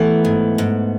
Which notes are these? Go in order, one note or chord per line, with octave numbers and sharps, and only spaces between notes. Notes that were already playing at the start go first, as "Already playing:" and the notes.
Already playing: E3 A3 B3
G#2
G#2